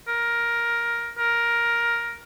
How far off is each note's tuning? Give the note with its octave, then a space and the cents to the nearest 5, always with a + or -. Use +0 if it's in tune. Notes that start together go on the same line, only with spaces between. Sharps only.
A#4 +10
A#4 +10